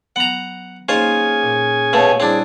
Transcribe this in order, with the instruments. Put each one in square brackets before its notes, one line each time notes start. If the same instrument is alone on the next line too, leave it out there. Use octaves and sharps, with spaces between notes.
[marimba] F#3 B3 [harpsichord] F#5 A#5
[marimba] A#3 D#4 D#5 [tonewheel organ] C#4 G#4 G#5 [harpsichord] F4 C5
[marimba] A#2
[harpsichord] B2 A3 [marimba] C#5 F5
[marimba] G3 E4 [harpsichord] C4 D4 [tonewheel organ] G#4